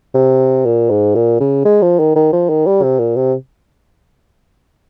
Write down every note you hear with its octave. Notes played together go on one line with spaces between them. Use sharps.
C3
A#2
G#2
A#2
C#3
G#3
F3
D#3
D#3
F3
D#3
G3
C3
A#2
C3